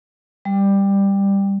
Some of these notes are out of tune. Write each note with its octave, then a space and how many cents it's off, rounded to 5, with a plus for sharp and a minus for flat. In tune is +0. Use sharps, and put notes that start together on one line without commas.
G3 +10